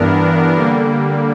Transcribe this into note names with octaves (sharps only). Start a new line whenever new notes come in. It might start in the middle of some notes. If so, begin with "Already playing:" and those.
Already playing: G2 E3 B3 D4 A#4
D3 G3 A#3